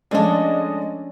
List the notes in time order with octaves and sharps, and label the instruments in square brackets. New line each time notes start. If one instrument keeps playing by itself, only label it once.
[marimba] F3 A3 [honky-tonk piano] G#3 A4 D5 [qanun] C#4 D4 [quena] D#5